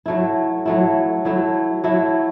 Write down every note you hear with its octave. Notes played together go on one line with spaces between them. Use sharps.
F#3 A3 E4
F#3 A3 E4
F#3 A3 E4
F#3 A3 E4